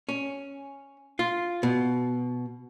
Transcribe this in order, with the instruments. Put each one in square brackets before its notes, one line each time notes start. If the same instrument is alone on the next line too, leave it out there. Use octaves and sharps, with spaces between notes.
[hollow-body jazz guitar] C#4
F4
B2